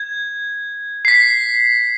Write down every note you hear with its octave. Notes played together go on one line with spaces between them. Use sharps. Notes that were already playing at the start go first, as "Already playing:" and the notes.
Already playing: G#6
C7
B6